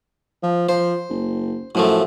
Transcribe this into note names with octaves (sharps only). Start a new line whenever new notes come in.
F3
F3 C5
F#1
F#2 A2 F3 A3